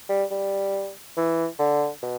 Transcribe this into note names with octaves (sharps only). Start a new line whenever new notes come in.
G3
G3
E3
D3
B2